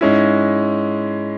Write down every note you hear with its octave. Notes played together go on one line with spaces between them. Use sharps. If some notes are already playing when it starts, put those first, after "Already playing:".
G#2 G#3 C#4 E4